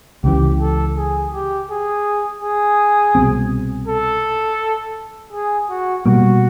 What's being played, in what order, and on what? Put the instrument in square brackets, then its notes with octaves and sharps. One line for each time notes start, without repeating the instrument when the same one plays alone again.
[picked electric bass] C#2 C#3 E3 [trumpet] G4
[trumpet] A4
G#4
G4
G#4
G#4
[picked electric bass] C2 B2 G3 C4
[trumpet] A4
G#4
F#4
[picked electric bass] B2 G3 A#3 [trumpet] F#4